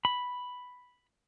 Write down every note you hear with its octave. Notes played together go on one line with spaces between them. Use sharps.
B5